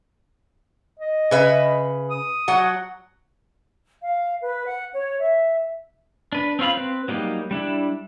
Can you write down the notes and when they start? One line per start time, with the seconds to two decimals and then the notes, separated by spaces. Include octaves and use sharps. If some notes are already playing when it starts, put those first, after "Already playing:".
1.00 D#5
1.31 C#3 B4 E5
2.10 D#6
2.48 F#3 F#5
4.02 F5
4.42 B4
4.66 F#5
4.94 C#5
5.20 E5
6.32 D4 B4
6.59 C4 C#4 F4 F5 B5
6.77 C4 B4
7.08 F#3 G3 A#3 D#4 G4
7.51 G3 D4 E4